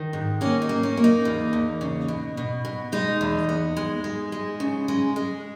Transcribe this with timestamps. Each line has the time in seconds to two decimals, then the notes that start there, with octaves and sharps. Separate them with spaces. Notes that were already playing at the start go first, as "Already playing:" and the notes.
Already playing: D#3
0.13 G#2
0.41 A#3 C#4
0.62 D#4
0.69 A#3
0.83 C#4
0.97 A#3
1.04 D#4
1.25 E2
1.53 E2
1.81 C#3
2.08 B2
2.37 B2
2.65 B2
2.92 G#3 D#4
3.21 E2
3.49 B3
3.77 G#3
4.04 G#3
4.32 G#3
4.60 C#3
4.88 G#3
5.16 G#3